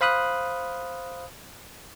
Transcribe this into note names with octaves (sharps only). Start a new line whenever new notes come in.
C5 F5 B5 D#6 F#6